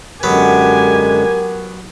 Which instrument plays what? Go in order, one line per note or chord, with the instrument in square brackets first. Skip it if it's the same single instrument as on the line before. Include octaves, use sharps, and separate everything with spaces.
[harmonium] F#2 D3 G#3 [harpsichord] F#3 B3 [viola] G4 G#5 [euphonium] A#4